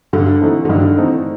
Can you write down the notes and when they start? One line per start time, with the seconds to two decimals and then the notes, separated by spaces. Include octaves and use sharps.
0.13 G2 D3
0.41 E3 A3 C4 D#4
0.65 D3
0.69 G2 D#3
0.97 E3 A3 C4 D#4